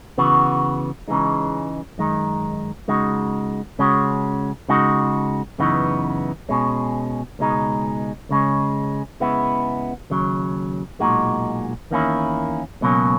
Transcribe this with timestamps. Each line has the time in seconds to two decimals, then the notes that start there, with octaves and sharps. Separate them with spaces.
0.18 C#3 E3 B3 F#4
1.08 C#2 C#3 E3 G#3 D#4
1.98 F#2 D#3 G#3 D#4
2.88 C#3 G#3 D#4 F#4
3.79 C#3 G#3 C#4 F#4
4.69 C#3 G#3 D#4 F#4
5.58 F#2 C#3 E3 B3 D#4
6.49 B2 G#3 C#4
7.39 C#2 B2 G#3 D#4
8.29 C#2 C#3 G#3 C#4
9.20 C#3 G#3 B3 E4
10.10 D#2 C#3 F#3
11.00 B1 A#2 G#3 D#4 F#4
11.91 E2 D#3 A#3 C#4 E4
12.81 C#2 B2 F#3 A#3 C#4